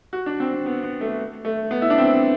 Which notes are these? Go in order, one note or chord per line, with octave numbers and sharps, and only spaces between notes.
F#4
D4
C4
C4
B3
B3
A3
A3
B3
E4
D4
C4